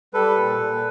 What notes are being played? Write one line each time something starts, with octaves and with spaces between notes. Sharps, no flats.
G3 A4 B4
A#2
A#2